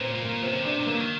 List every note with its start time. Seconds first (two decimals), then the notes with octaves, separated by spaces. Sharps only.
0.01 A#2 C4
0.15 A#2
0.22 A#3
0.29 A#2
0.43 C3 C4
0.52 D3
0.60 C3 D4
0.80 C3
0.86 D3 A#3
0.95 F#3
1.00 D#3